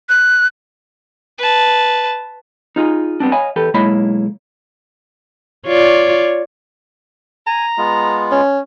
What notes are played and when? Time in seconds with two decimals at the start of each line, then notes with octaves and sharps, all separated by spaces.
0.09 F#6
1.38 B4 A5
2.76 D#4 F4 G#4
3.20 G3 B3 C4 D4
3.32 C#5 D#5 F5 G#5 B5
3.56 E2 G4 A4 B4
3.74 B1 G#3 A#3 E4 C#5 B5
5.66 F4 C#5 D5
7.47 G#5 A#5
7.78 G#3 B3 F4
8.32 C#4